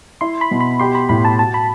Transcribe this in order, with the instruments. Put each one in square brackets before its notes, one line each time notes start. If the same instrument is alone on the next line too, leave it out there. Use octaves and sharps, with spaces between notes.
[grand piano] E4 [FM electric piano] C6
[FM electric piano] B5
[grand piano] B2
[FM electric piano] B5
[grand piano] G4 [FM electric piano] C6
[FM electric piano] B5
[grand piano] A2 [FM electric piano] B5
[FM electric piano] A5
[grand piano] F#4 [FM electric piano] A5
[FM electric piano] B5